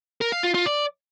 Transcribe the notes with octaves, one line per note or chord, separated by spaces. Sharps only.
A#4
F5
F4
F4
D5